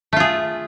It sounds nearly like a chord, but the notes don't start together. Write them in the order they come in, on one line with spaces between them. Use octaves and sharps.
A3 F4 G#4